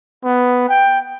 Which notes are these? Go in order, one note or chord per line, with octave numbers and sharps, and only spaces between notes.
B3
G5